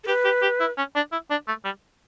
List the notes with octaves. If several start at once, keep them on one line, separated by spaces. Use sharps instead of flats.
A4
G4 B4
G4
G4
E4
C#4
D4
E4
D4
A3
G3